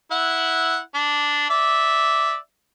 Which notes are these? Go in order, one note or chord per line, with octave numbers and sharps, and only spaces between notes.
E4 F#5
D4
D5 E5